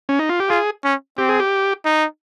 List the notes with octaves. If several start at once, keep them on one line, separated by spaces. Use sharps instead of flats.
C#4
D#4
F4
G4
F4 G#4
C#4
C4 G4
G#4
G4
D#4